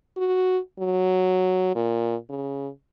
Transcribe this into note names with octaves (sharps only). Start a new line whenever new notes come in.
F#4
F#3
A#2
C#3